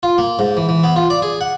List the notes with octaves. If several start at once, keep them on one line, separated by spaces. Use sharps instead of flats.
F4
A#3
G#2
E3
E3
B3
F4
D5
G#4
F#5